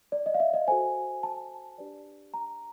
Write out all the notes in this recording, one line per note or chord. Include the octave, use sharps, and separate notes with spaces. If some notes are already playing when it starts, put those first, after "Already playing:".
D5
D#5
F5
E5
D#5
F#4 A4 C5 G#5
A5
D4 G4 B4 D5
A#5